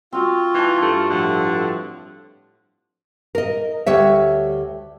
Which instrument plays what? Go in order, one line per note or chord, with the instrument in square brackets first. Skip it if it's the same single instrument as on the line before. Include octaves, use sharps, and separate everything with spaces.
[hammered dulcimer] C4 F#4 [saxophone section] F4
[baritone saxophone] E3 [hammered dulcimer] A5 D6
[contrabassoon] G2 [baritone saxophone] A3
[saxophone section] A2 F3 [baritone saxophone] D3
[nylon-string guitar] A#4 D#5
D2 G3 C#5 E5